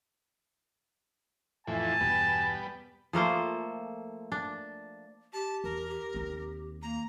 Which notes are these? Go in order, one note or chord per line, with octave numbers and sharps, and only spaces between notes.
F2 A2 E3 G#5 A5
E2 G2 B2 G3 B3
F3 A3 A#3 C5
D4
G4 A5
E2 A#4
G4
D#2 C4
A#3 A#5